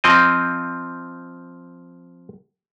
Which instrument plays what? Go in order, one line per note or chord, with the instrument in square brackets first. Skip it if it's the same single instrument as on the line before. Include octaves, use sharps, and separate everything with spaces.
[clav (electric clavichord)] F3 C4 D#5